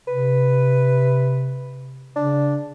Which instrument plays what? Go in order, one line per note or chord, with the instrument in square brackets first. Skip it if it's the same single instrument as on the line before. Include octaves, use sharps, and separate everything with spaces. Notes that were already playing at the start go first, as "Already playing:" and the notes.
[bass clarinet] C3 [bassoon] B4
[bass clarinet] C#3 [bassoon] D4